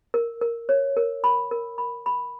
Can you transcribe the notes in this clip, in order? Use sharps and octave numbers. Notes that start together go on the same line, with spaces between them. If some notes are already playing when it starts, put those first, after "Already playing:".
A#4
A#4
C#5
A#4
B5
A#4
B5
B5